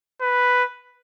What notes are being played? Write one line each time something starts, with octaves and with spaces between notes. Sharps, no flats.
B4